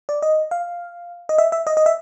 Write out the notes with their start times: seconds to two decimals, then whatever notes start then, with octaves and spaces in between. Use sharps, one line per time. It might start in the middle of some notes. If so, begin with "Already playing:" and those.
0.09 D5
0.22 D#5
0.51 F5
1.29 D#5
1.38 E5
1.52 E5
1.67 D#5
1.77 D#5
1.86 E5